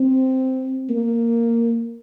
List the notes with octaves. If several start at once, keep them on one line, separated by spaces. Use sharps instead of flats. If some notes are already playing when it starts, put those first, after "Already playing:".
Already playing: C4
A#3